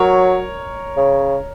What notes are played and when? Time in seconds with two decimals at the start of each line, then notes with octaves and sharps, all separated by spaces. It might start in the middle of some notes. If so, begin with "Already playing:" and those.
Already playing: F#3 A#4 C#5
0.97 C#3